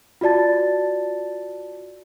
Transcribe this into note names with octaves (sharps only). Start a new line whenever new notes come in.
F4 F#4 D5 A5 A6